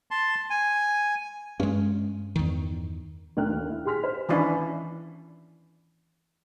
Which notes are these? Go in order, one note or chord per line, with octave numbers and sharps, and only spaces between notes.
A5 C6
G#5
G2 G#3 C#4
E2 D#3
D2 D4 A#4 G5 F6 F#6
D#2
E4
G4 G#4 C6 F6 B6
C5
D#3 E3 C#4 D4 E4